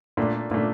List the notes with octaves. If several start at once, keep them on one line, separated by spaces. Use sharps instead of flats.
A#2 A3 D4
A#2 A3 D4